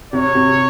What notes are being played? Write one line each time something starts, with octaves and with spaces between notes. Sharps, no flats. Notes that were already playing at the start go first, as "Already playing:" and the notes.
C3 C#5
C3